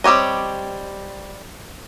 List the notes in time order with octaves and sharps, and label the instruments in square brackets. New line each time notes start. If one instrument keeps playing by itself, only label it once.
[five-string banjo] G3 C4 G4 C#5 D#5